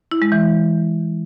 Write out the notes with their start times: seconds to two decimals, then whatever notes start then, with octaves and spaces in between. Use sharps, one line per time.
0.11 E4
0.22 G#3
0.32 E3